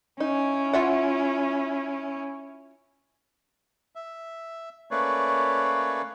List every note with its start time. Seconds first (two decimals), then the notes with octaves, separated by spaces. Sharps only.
0.20 C#4 D#4 E4
0.73 F4 E5 F#5
3.95 E5
4.91 A3 A#3 C#4 B4 C#5 D5